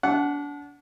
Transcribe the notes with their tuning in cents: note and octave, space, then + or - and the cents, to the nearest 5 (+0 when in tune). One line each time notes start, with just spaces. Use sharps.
D4 -30 F#5 +0